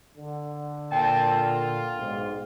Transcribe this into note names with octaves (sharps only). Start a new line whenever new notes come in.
D3
A#2 C4 G5 A5
F4
B1 G#2